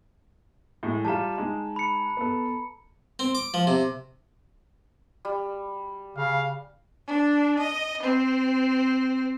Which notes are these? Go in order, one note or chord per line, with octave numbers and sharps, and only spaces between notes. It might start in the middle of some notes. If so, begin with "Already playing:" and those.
A2 G#3 A3
G3 F4 A5 A#5
G#3 D#4
B5 C#7
B3 A4
C4
D6
F3
C3
G3
C#3 F5
D4
D#5
C4